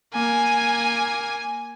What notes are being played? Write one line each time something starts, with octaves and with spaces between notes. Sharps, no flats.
A#3 G#5